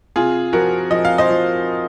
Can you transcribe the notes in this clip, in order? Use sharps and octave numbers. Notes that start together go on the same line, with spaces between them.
C3 F4 G#4
F3 F#4 A#4
F3 D#5
F5
C5 D#5
F3